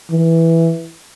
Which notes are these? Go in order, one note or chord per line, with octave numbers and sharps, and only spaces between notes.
E3